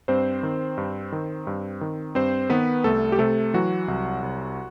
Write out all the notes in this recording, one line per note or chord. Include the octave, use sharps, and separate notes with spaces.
G2 C4 C5
D#3
G2
D#3
G2
D#3
G2 C4 C5
D#3 B3 B4
C2 A3 A4
G4
C3 A3 A4
E3 F#3 F#4
C2
C2